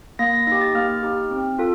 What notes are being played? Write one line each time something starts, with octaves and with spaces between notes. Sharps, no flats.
A#3 A#6
A#6
D#4 G4 A#6
A6
A#3 F6
D#4 G4
C4
F4 A4